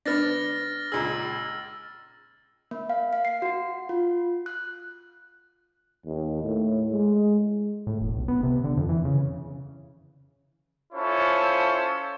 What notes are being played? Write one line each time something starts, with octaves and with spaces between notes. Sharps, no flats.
D3 B3 D4 F6 A6 A#6
C#2 A#2 G#4 E6
A#3
F5
F5
C7
F#4
F4
F#6
D#2
A2
G#3
A2
E1
B1
B3
C3
D3
F2
E3
C#3
C#4 E4 F4 A4 C5 C#5